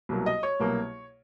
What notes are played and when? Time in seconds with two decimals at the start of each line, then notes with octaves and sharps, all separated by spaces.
0.09 C2 B2 F#3 A#3
0.26 D#5
0.43 C#5
0.60 C2 B2 F#3 A#3